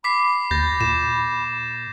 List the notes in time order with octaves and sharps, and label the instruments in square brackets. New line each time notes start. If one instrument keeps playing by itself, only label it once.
[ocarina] B5 [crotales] D6 B6 C7
[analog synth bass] D#2 [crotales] G6 A6 A#6
[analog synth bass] A#2 [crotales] E7